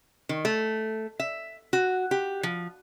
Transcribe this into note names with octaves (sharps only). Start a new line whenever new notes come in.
D#3
A3
E5
F#4
G4
F3